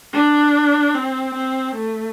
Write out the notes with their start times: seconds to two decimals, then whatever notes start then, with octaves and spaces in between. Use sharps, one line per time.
0.13 D4
0.94 C4
1.34 C4
1.75 A3